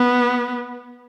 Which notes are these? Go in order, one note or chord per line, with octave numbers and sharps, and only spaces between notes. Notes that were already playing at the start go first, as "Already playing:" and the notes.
Already playing: B3